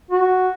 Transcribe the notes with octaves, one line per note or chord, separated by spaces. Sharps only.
F#4